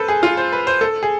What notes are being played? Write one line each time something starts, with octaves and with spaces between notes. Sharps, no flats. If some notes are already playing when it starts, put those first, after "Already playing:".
Already playing: A4 B4 C5
G#4
F4
C5
B4
C5
A4
G#4